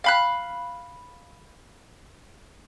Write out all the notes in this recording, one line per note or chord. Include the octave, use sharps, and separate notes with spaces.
F5 B5 F#6